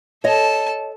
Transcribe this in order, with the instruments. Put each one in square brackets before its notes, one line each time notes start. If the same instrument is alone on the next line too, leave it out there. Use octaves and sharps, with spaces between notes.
[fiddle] A4 A5 [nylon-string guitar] C#5 D#5